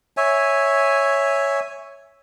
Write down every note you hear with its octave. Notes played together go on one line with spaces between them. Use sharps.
C#5 E5 G#5